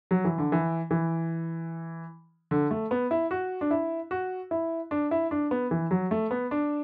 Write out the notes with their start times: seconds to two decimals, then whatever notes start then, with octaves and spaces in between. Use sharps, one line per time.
0.11 F#3
0.25 E3
0.38 D3
0.52 E3
0.91 E3
2.51 D3
2.71 A3
2.91 B3
3.11 E4
3.31 F#4
3.61 D4
3.71 E4
4.11 F#4
4.51 E4
4.91 D4
5.11 E4
5.31 D4
5.51 B3
5.71 E3
5.91 F#3
6.11 A3
6.31 B3
6.51 D4